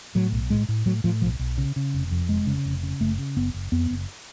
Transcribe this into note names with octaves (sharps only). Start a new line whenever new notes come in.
A2 F#3
B1
A2 G#3
A2
A2 F#3
A2 F3
B1 F3
B1
C#3
C#3
F1
F2
F1 G#3
C#3
F1
C#3
F#1 A3
C#3
F#1 B3
F#1
F2 B3
F#1